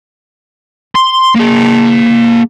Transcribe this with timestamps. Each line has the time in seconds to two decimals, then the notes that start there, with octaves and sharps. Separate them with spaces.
0.96 C6
1.36 A#3 G#4